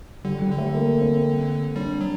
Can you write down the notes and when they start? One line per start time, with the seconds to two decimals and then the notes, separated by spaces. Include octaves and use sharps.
0.25 D3 G3
0.42 G3
0.51 D3
0.58 A3
0.75 A#3
1.01 C4
1.76 G3 D4
2.01 F#3